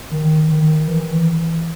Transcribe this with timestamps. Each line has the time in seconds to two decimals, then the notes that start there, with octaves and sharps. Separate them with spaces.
0.11 D#3
0.49 D#3
0.87 E3